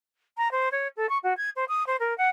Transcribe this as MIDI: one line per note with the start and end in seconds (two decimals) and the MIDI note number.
0.37 0.51 82
0.51 0.69 72
0.72 0.88 73
0.97 1.09 69
1.09 1.18 85
1.23 1.36 66
1.37 1.50 92
1.56 1.65 72
1.68 1.86 87
1.87 1.96 72
2.00 2.16 70
2.18 2.29 78